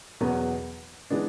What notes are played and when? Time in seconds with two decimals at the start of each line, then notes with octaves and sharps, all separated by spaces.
0.21 E2 B2 F#3 B3
1.10 E3 G#3 B3 D4